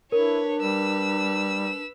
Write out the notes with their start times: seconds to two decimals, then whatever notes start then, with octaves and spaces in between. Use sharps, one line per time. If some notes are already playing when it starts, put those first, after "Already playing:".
0.12 D4 E4 A#4 B4 C#5
0.60 G3 B4 E6